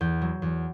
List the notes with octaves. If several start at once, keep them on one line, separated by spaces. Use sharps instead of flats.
E2 G6
F#3
E2